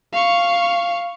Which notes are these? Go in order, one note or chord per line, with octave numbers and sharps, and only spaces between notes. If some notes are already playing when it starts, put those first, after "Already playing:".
F5 C#6